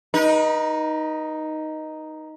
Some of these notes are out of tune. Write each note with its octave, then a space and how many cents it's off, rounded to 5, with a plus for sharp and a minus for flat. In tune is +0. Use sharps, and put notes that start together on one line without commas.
D#4 +0 B4 -45